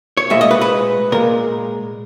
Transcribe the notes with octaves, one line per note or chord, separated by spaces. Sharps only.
C#5
A#2 G#3 E5
D#5
B4
B4
A#2 G#3 A#4